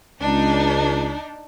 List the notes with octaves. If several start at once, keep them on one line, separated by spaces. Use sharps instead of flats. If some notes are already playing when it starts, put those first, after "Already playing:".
C#2 D4 D#4